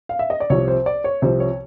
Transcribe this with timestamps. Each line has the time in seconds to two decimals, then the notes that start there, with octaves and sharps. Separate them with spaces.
0.09 F5
0.19 E5
0.30 D#5
0.40 D5
0.50 C2 C3 F3 C#5
0.68 C5
0.86 D5
1.04 C#5
1.22 C2 C3 F3 C5
1.40 C#5